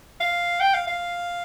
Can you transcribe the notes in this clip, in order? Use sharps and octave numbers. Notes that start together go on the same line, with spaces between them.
F5
G5
F5
F5